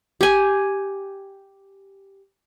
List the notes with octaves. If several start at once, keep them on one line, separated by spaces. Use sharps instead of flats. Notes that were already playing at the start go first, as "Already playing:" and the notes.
G4 G#5